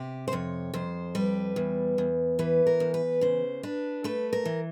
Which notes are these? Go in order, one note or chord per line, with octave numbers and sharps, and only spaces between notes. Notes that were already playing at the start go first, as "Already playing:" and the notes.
Already playing: C3 G4
C5
F2 C#5
F2 C5
G3 B4
E2
E2
E3 B4
A#4
E2
B4
C#3 C5
D4 B4
A3 B4
A#4
E3